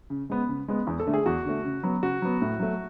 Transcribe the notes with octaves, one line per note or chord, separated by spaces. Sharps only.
C#3
G#3 B3
C#3
G#3 B3
E2
A4
D3 A3
G#4
E2 F#4
D3 A3
C#3
F#3 B3
C#3 F#4
F#3 B3
A2
F#3 A3